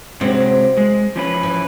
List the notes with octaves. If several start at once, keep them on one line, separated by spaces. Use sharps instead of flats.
C3 F#3 G#3 C4
G#3
F3 C#4 B4
E3